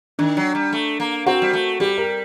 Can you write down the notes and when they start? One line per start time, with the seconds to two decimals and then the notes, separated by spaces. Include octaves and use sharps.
0.19 D#3 D4
0.37 F#3
0.55 G3
0.73 A3
1.00 A#3
1.26 C4 F#4
1.42 G3
1.53 A3
1.80 G3 G4
1.98 A#4